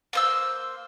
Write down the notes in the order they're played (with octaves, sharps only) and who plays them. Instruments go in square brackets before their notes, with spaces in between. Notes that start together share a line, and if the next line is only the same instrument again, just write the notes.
[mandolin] A#3 C5 E6